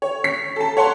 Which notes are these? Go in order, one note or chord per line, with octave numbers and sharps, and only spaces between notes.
C#5
B6
A4 A5
C#5 F#5 A5 C6